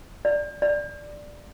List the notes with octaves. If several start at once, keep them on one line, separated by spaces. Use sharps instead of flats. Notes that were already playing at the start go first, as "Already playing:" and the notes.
D5
D5